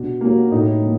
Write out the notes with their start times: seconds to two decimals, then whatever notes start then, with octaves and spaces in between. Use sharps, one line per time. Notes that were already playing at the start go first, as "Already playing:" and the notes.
Already playing: B2 D4
0.21 F#3 A#3
0.51 A2 D#4
0.82 F3 A#3